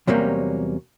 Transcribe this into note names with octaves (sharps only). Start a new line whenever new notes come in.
E2 C3 F#3 G3 A#3 C#4